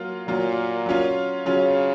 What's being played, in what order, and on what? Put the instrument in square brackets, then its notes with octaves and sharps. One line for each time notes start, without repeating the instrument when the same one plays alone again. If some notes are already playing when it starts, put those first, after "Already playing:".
Already playing: [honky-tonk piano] F#3 A#3 F4
[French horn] A#2 [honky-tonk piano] F#3 A#3 F4
[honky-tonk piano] F#3 C#4 F4
[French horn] C#3 [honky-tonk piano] F#3 C#4 F4